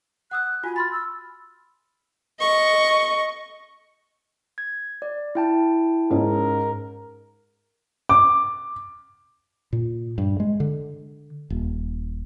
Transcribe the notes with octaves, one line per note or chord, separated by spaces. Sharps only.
F#5 D#6 E6 F#6
F4 F#4 G#5
B5 C6 F6 A6
E6
D#5 C#6
G#6
D5
E4 G5 A5
G#2 C#4 A#4
D6
A#2
G2
G#3
D3
D#1